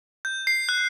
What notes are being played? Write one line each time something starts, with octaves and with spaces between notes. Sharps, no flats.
G6
C7
F#6